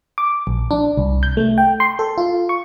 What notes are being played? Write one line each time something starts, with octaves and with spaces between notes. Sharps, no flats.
D6
A#1
D4
C2
G6
A3
G5
C6
A4
F4
C#6